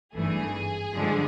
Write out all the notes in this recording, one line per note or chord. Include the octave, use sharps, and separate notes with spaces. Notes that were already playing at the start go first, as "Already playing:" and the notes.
G#1 G2 E3 A3 G#4
G2 D3 F3 G#3